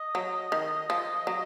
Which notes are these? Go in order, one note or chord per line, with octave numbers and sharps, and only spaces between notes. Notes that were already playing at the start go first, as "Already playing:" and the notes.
Already playing: D#5
F#3
D#3
F3
F#3